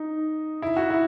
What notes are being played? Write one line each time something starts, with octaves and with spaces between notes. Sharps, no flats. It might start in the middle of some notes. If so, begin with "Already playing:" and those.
Already playing: D#4
E4
F#4
E4